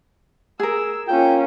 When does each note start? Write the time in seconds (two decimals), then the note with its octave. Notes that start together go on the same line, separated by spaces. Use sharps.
0.60 G#4 A#4 E6
1.08 A#3 C#4 F4 G5